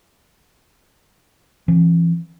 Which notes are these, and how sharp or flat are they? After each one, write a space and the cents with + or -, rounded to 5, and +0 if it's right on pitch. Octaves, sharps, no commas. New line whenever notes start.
E3 +40 C#4 -40